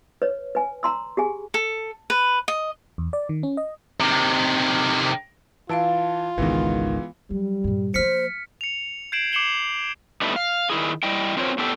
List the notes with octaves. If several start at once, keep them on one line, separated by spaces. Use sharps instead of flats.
B4 C#5
B4 G#5
A#5 C6 E6
G4 G#4 G#5
A4
B4
D#5
E2
D5
D#3
C#4
D#5
C3 D#3
E3 F4 F5 A5 E6 D7
G#1 C#2 D#3 E3 G#3 B3
F#3 G3
G2 A#2
F3 A#3 C5 F6 B6 C#7
C#7 F7
G6 G#6 C7 D7 E7 F#7
D6 C7 C#7 E7 F#7 G7
D3 G3 A3 B3 D#4 E4
F5
D#3 E4 G#4
G3 E4 D#5 G5
C4 F4 F#4 A#4 C5 C#5
A2 B3 D4 G4 A4